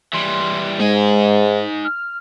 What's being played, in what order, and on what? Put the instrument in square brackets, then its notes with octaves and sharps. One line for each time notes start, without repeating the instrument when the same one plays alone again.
[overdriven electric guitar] E3 G3 [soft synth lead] C6
[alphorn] G#2 [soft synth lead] G#3 [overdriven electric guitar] D#4 G#5
[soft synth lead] F6